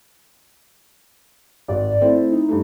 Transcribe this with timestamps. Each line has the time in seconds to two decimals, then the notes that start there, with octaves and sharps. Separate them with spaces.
1.68 G#1 D5
2.00 A3 C4 E4
2.32 D#4
2.49 G2 A3